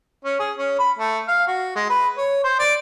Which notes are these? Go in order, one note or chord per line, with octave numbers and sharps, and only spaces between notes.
C#4
G#4
C#4
B5
A3
F5
F#4
G#3
B4
C#5
C5
D5